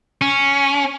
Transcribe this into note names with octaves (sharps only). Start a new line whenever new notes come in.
C#4